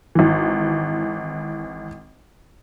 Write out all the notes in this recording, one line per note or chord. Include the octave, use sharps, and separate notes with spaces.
G#1 E3